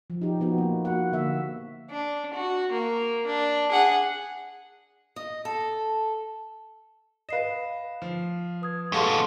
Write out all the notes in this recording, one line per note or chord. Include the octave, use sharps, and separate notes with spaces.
F3
D#4 G4
F3 B3 D#4 F#4
A#3
A#3 F#4 F#5
D3 A#3 E5
D4
F#4
A#3
D4
G#4 F#5
D#5
A4
B4 D#5 F5 C7 E7
F3
B4 D#6 G#6
F#2 A#2 G#3 G4 A4 B4 F5 A5